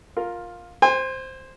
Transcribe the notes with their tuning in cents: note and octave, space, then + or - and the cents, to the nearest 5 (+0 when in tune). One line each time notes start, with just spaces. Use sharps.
F4 +10 A#4 +0
C5 +0 G#5 -40